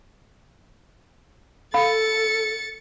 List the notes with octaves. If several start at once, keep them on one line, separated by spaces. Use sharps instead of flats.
A4 F5 B5 A6 C#7